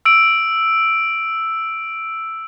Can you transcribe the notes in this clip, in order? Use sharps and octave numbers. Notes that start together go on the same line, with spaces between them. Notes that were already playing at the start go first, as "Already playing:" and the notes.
E6 D7